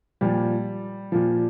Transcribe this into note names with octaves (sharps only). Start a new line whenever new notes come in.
A#2 F3 G3
A#2 F3